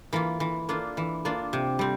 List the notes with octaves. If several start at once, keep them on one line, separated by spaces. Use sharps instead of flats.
E3 A#3 F4
E3
A#3 D4 F4
E3
A#3 D4 F4
C3
G3 C4